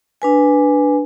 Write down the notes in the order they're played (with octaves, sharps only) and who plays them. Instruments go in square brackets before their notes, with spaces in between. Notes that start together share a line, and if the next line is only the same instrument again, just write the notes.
[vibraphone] D4 B4 G#5